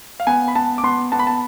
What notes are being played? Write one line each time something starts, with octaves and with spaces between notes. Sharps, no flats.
F5
B3 G#5
B5
B3 A5
D6
B3 C6
B3 A5
B5
A5